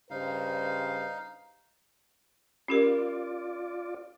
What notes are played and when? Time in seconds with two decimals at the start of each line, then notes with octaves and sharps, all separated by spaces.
0.10 G2 C#3 D#4 C5 F5
2.68 C#4 F4 G4 A#4 D5